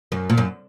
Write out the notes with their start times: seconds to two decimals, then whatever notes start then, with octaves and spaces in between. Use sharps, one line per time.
0.12 F#2
0.30 A#2
0.38 F#2